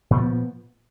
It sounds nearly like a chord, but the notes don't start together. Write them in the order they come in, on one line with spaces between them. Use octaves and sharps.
A#2 B3 F3